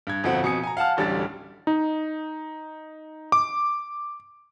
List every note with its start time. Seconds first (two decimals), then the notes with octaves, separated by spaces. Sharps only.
0.07 G2 G#6
0.23 G1 F2 B2 C4 F#5
0.43 F2 B2 G#5 D#6 C#7
0.63 G#5 A#5
0.77 F5 F#5 A5 F6
0.97 D1 A1 G3 D4 A6
1.67 D#4
3.32 D6